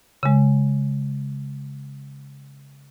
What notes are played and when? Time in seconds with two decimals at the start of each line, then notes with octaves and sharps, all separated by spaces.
0.23 C#3 G#3